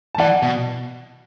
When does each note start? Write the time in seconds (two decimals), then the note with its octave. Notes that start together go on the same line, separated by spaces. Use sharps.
0.15 A5
0.19 E3 D5 F#5
0.43 B2